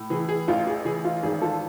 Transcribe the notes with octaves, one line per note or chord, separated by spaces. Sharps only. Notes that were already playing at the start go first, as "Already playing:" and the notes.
Already playing: A2
E3 G#4
G#4
A1 F4
G#4
E3 G#4
F4
G#1 G#4
F4 A4